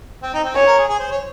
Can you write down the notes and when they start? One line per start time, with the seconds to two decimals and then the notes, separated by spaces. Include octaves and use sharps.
0.22 C4
0.34 D#4
0.44 C4
0.55 C#4 C#5
0.67 A#4
0.78 G#4
0.88 G#4
0.99 C5
1.11 C#5